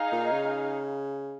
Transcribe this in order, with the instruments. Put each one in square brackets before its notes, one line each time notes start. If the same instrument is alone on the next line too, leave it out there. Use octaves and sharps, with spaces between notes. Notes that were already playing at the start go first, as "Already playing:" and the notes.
Already playing: [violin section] D#4 G#4 F5
[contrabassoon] A#2
C#3